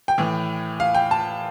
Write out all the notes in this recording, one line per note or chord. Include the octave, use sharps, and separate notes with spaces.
G5
A2 E3
F5
G5
A5